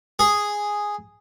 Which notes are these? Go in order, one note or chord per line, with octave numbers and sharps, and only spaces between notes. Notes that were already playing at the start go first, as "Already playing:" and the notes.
G#4